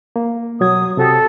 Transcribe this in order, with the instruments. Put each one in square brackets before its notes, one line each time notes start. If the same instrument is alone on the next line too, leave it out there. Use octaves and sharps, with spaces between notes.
[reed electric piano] A#3
[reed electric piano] B2 F#3 G#6 [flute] D#6
[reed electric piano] C3 F#4 G4 [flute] A4